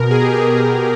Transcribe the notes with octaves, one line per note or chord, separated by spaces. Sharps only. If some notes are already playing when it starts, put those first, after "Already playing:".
Already playing: B2 A#4
G#4
G4
G4
G#4